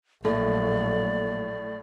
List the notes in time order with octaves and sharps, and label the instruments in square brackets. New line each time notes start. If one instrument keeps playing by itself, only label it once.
[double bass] A#1 F#3 [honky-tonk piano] A2 [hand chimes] A#3 A4 [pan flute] D5